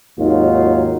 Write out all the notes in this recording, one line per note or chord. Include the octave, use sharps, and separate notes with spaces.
G#1 D#2 D#3 F#3 D#4 F4